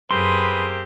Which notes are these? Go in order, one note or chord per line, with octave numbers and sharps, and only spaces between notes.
F#2 A#3 C4 G4 G#4 B4 C6 D#6